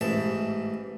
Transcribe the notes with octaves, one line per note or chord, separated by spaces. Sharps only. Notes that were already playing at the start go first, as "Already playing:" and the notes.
A1 G#2 E3 A5